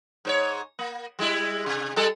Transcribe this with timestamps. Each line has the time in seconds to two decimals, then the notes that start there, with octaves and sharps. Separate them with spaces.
0.25 G#2 C5 C#5
0.79 A#3
1.19 G3 G#3 E4
1.66 C3
1.96 G3 G#3 A4